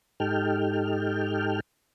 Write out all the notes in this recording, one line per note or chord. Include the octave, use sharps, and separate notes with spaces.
G#2 D#4 G4 A4 G5 F6